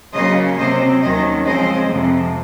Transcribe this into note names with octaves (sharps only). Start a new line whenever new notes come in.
C#3 F#3 A#3 C#4 C5 D#5
C3 F#3 C4 C5 D#5
D#2 D#3 F#3 C#4 C5 D#5
C#3 F3 G#3 C4 C5 D#5
F2 C3 F3